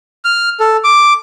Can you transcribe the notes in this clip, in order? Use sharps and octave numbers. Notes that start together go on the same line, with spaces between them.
F6
A4
D6